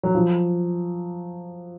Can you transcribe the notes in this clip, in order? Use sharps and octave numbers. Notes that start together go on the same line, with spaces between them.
F#3
F3